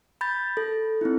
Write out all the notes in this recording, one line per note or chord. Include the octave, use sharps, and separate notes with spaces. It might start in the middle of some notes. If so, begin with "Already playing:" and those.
B5 G6 A6
A4
C4 D#4 E4